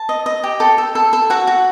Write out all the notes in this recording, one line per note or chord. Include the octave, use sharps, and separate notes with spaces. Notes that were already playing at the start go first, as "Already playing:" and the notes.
Already playing: A5
D#5
D#5
G4
A4 G5
A4
A4
A4
F#4 F#5
F#4